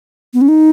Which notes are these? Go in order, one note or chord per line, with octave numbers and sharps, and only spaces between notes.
B3
C#4
D#4